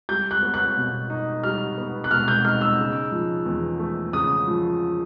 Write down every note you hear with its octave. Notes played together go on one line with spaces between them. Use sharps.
G3 G6
F#6
B3
F#6
B2
D#4
G3 F6
B3
F#6
B2 F6
G6
D#4 F6
E6
C#3
F3
E2
A3
C#3 D#6
F3